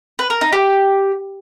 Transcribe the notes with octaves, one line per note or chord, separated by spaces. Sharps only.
B4
A#4
D#4
G4